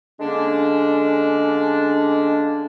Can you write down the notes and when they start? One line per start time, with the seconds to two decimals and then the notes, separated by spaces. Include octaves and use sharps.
0.20 D3 G#3 A#3 C#4 D4